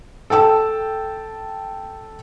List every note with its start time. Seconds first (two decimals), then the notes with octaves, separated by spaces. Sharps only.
0.30 A4 G5 A5 E6